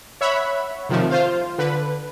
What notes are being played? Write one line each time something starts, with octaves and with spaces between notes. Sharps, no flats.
C#5 E5 F#5 B5
C3 D#3 F3 A3
F4 C5 F5
D3 B4